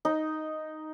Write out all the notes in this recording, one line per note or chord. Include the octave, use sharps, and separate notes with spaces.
D#4